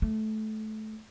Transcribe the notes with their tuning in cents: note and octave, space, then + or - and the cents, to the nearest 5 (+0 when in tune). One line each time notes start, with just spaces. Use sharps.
A3 -20